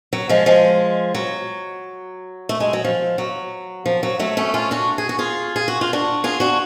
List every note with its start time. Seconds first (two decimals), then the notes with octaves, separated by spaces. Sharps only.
0.13 F#3
0.29 F3 G#3
0.46 F3 G#3
1.14 F#3
2.49 A3
2.60 G#3
2.73 F#3
2.84 F3
3.18 F#3
3.86 F3
4.03 F#3
4.19 F#3 A3
4.37 A3 C#4
4.54 C#4 F4
4.71 D4 F#4
4.98 G#4
5.09 F#4
5.19 F4 G#4
5.56 G#4
5.68 F#4
5.81 F4
5.93 D4 F#4
6.24 F4 G#4
6.40 D4 F#4